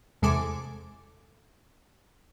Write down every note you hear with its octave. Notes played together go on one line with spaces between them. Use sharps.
E2 C3 G#3 A4 G#5 D6